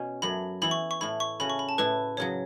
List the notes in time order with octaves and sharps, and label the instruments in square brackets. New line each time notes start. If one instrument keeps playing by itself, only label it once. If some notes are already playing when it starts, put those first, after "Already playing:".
Already playing: [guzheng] B2 C#4
[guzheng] F#2 F#3 A3 [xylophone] B5
[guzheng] E3 B3 E4 [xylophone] B5
[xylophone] C#6
C#6
[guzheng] A2 A3 E4 [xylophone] B5
[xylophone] C#6
[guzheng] C#3 A3 C#4 F#4 [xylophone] B5
[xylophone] C#6
B5
A5
[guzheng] A2 A3 E4 [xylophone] B4
[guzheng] F#2 C#3 F#3 [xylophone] C#5